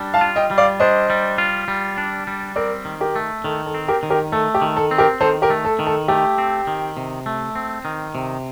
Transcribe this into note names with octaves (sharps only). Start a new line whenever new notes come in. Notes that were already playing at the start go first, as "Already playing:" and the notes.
Already playing: G3 D4
F5 A5
F4
D#5 G5
G3
D5 F5
D4 C5 D#5
G3
F4
G3
D4
G3
C4 A#4 D5
D#3
G4 A#4
A3
D#3 A4
A4
C4
G4 A#4
D#3
G4 A#4
A3 A4
G4
D#3
A4
C4
G4 A#4
D#3 A4 C5
G4 A#4
A3
A4
D#3
A4
A3 G4
C4
D#3
C3
A3
C4
D#3
C3